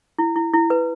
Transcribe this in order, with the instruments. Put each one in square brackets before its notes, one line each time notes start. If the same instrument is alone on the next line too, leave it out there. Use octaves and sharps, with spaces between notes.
[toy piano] E4
E4
E4
B4